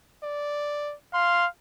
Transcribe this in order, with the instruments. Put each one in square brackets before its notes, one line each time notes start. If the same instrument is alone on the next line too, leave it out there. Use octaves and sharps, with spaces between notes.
[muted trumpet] D5
[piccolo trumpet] F5 [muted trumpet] C6